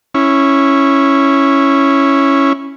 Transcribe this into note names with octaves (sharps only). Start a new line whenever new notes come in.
C#4 E4